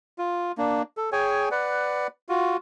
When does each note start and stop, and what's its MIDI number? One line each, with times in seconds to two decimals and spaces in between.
0.19 0.52 65
0.58 0.82 58
0.58 0.82 62
0.97 1.10 69
1.12 1.49 68
1.12 1.49 73
1.12 1.49 79
1.12 1.49 80
1.51 2.07 71
1.51 2.07 74
1.51 2.07 78
2.29 2.57 65
2.29 2.57 66